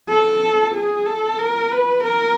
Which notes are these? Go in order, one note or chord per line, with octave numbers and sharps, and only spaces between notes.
A4
G#4
A4
A#4
B4
A#4